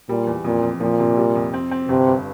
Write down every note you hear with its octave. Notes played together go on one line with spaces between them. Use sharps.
A#2 G3
E2
F2 A#2
F2
A#2 F3
C3
G3
F2
C4
C4
G1 C3
G2